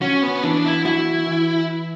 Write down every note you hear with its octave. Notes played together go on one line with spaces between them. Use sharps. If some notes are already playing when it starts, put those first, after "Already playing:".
C#4 F#4
B3
E3 D4
E4
E4 F#4
E3